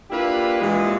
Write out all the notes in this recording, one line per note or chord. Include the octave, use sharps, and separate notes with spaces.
A#3 D4 E4 F4 G4 B4
A#2 E3 G3 G#3